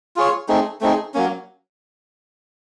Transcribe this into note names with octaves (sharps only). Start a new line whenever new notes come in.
F4 G#4 C#5
A3 C4 D#4 G#4
A3 C4 D#4 G#4
F#3 A#3 C#4